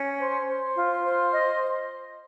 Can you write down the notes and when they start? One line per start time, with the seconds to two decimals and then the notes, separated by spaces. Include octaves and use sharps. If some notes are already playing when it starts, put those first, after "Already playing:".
Already playing: C#4
0.19 C5
0.47 C5
0.75 F4
1.04 C5
1.32 D#5